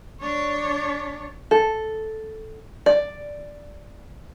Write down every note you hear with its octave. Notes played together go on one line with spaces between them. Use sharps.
D4 C#5
A4
D5